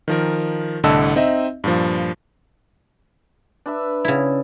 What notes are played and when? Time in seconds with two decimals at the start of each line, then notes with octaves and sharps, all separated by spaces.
0.08 D#3 F3 A#4
0.83 C2 A2 D3 D#5 A5 E6
1.16 C4 D#4 D#5 E5
1.64 G2 A#2 F3
3.66 D4 B4 E5
4.05 C#3 E4